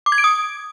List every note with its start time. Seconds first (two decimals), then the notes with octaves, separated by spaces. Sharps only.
0.06 D6
0.12 G#6
0.18 D7
0.24 D#6